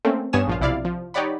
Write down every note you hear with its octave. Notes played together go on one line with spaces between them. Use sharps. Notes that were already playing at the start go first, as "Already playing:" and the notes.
A3 A#3 C4 C#4 A4
G2 B3 C#5 G#5 D#6 E7
A#1 F3 F4
B1 C3 E4 D5 F5
F3
D#4 G4 C#5 D5 F#5 B5